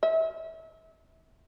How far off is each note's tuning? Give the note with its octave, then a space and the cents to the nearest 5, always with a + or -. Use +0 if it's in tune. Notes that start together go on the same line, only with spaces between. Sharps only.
E5 -25